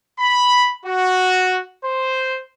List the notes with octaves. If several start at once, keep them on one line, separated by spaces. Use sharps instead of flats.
B5
F#4
C5